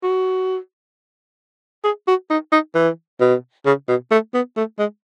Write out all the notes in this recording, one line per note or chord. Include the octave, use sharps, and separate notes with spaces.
F#4
G#4
F#4
D#4
D#4
E3
B2
C#3
B2
A3
B3
A3
G#3